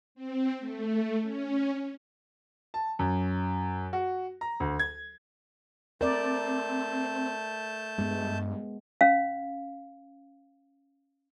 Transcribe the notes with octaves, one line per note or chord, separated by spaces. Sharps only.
C4
A3
C#4
A5
F#2
F#4
A#5
D2
G#6
A3 C4 A#4 D5 A5 G6
G2 G#3 B3
C#4 F5